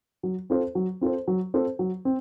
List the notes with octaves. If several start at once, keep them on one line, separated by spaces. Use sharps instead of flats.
F#3
C4 F4 A4 C5
F#3
C4 F4 A4 C5
F#3
C4 F4 A4 C5
F#3
C4